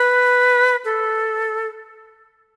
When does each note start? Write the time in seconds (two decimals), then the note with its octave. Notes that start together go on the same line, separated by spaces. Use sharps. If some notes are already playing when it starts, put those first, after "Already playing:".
Already playing: B4
0.85 A4